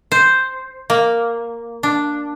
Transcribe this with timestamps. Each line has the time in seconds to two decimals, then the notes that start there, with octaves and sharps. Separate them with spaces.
0.12 C5
0.90 A#3
1.83 D4